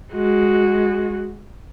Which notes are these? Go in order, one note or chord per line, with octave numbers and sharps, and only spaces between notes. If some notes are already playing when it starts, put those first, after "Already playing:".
G#3 F#4